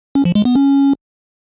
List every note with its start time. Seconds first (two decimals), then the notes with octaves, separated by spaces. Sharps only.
0.15 C#4
0.25 F3
0.35 G#3
0.45 B3
0.55 C#4